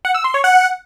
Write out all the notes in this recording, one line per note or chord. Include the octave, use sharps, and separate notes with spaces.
F#5
E6
C6
C#5
F#5